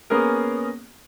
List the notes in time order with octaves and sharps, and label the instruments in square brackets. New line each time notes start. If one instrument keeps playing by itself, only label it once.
[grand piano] A#3 B3 C#4 G#4 A#4